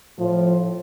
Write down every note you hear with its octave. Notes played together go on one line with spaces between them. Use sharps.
A2 F3